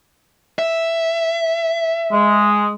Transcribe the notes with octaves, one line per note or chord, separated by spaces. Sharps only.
E5
G#3